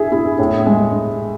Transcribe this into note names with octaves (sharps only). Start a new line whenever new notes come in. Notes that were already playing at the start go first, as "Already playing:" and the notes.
Already playing: E4 G#4
E4
A2
G#3